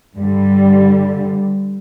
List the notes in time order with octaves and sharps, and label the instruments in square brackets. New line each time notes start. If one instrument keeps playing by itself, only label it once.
[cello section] G2 D3 G3